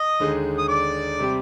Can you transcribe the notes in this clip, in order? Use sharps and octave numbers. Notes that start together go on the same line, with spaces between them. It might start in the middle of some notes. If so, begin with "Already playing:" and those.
Already playing: D#5 D#6
D#2 D3 G#3 D#4 G#4
D#6
D5 D6
C3 G3 C4 G4